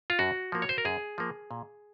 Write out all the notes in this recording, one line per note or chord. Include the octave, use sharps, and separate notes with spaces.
F4
F#2 F#4
F3 A#3
C#5
C5
A#4
F#2 G#4
F3 A#3
A#2